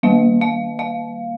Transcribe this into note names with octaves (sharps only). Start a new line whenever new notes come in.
D#3 G3 A#3 F5
F5
F5